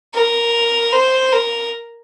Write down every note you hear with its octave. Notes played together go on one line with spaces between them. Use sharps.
A#4
C5
A#4